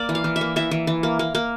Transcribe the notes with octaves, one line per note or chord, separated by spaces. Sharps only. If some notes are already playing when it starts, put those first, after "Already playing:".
Already playing: A#3 D5
E3
F5
E3
E5
A#3
E3 E5
E3
E3
A#3
A#3
A#3